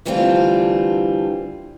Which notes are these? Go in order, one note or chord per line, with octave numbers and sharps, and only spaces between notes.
D3 E3 G3 A3 C4 F4